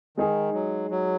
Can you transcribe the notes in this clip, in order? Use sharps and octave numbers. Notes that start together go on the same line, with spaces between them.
D#3 G#3 D#4 G#4
F#3
F#3